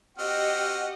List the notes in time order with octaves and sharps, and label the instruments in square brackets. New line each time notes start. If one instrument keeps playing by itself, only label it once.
[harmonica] C4 F#4 F6 [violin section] G4 D#5 F#5